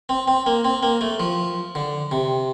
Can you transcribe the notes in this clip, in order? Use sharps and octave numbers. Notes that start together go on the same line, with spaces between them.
C4
C4
A#3
C4
A#3
A3
F3
D3
C3